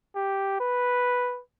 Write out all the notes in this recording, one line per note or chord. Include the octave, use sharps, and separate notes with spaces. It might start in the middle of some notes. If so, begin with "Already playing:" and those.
G4
B4